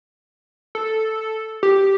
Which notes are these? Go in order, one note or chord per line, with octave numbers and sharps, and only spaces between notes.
A4
G4